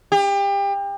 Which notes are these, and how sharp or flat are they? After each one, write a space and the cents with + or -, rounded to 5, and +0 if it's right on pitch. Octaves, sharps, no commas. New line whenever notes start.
G4 +30